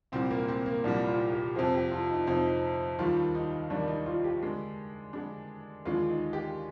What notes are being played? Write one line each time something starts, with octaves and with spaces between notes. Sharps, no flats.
C2 A#2 G3 C4
A#3
C4
A#3
C2 A#2 G3 D4
F4
G4
F2 C3 F3 G#4
G4
F4
D#4
F2 C3 F3 D#4
D#2 D#3 G3 F4
D#4
D#2 D#3 G3 D4
D#4
F4
G4
D3 G#3 D4
D3 G#3 D4
D#2 D3 G#3 D4 F4
D#4
G4